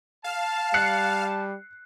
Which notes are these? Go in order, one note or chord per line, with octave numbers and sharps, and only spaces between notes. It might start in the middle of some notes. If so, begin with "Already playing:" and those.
F5 A5
G3 F#6 C7 C#7